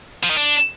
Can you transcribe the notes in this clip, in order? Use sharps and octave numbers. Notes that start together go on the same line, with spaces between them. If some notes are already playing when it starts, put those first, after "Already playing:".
F3
D#3
D4